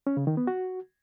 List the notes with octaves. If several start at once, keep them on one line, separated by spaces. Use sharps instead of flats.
C#4
C#3
D#3
B3
F#4